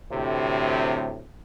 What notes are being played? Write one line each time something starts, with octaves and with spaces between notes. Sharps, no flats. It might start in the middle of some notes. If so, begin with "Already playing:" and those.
D2 A2 C3